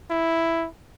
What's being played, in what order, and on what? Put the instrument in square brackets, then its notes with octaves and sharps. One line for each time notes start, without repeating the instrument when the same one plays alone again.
[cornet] E4